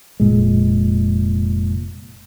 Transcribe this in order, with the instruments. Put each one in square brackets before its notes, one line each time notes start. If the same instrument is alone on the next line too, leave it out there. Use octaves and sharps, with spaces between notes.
[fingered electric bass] F1 A#2 G#3